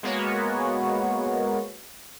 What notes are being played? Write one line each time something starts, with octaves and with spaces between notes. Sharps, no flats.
G#3 A#3 B3 F#4 A#4 C#5